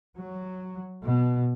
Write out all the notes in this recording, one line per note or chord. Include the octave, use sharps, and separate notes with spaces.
F#3
B2